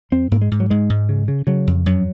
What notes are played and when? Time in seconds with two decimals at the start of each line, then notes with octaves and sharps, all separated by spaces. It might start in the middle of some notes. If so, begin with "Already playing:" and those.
0.12 F2 C4
0.31 G#2 A#3
0.42 G#3
0.51 G#2
0.60 F#3
0.70 G#2 G#3
0.90 G#2
1.09 C#3
1.28 C#3
1.47 C#3 F#3
1.67 F2
1.86 F#2 F#3